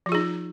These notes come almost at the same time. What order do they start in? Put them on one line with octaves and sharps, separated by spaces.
F3 F4 G#4 D#4